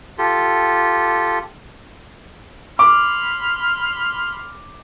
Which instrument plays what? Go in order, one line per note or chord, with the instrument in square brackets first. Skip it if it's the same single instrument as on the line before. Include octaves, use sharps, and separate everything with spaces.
[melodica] F4 G4 A4
[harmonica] B5 C6 F6 [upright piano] D6